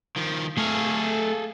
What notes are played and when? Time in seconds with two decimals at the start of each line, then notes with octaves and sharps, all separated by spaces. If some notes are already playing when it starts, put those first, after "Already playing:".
0.16 D#3 F3
0.57 A3 G#4 A4 F5